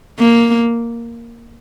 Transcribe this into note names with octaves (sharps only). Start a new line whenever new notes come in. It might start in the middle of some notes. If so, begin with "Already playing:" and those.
A#3